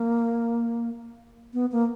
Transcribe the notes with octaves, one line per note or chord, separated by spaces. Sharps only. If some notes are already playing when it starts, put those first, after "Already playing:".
Already playing: A#3
B3
A#3